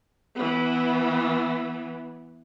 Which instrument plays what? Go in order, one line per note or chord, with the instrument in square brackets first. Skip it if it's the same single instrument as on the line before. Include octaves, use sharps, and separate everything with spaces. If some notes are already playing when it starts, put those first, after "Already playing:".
[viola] E3 B3